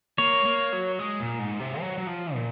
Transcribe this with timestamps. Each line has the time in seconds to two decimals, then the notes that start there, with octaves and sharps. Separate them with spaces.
0.18 A#3 C#5
0.45 A#3
0.73 F#3
0.99 G#3
1.20 A#2
1.39 G#2
1.60 C3
1.81 F#3
1.98 F#3
2.07 F3
2.34 A#2